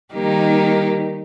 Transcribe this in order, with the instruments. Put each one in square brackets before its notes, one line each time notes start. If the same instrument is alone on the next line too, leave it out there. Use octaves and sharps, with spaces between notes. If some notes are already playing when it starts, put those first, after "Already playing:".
[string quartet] D#3 G3 A#3 D#4 G4